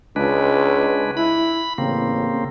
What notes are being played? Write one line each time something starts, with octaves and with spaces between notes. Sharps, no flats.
C#2 G#3 D4 B4
E4 B5
A1 C#3 A#3 C4